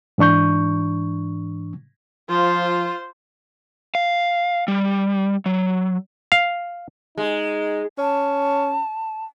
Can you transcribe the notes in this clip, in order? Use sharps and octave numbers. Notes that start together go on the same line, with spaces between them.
G#2 E3 D4 C#6 G6
F3 F4 C5
F5
G3
F#3
F5
G#3 D#4
C#4 A5